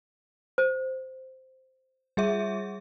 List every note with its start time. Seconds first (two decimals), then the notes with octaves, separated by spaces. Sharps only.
0.58 C5
2.17 G3 G#4 E5